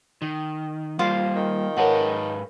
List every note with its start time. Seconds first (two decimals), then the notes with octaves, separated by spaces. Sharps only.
0.22 D#3
0.99 G3 A#3 F4 C5 F5
1.36 D#3
1.77 G#2 A#4 B4 C#5 F#5 A5